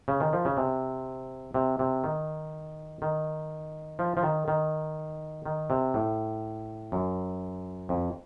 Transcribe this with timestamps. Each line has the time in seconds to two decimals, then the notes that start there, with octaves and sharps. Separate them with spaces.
0.08 C#3
0.20 D#3
0.33 F3
0.45 C#3
0.57 C3
1.54 C3
1.79 C3
2.04 D#3
3.02 D#3
3.99 F3
4.17 F3
4.23 D#3
4.48 D#3
5.46 D#3
5.70 C3
5.94 A2
6.92 F#2
7.89 F2